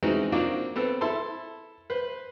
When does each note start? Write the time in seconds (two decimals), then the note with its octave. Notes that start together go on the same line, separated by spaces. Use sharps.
0.03 E3 G#3 C4 C#4 D#4 F#4
0.32 A#3 C4 D4 D#4 F4 F#4
0.76 B3 C4 A4
1.01 E4 A4 A5 C6
1.90 B4 C5